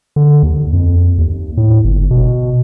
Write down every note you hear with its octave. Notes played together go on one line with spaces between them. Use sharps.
D3
D#2
F2
D#2
A2
G1
B2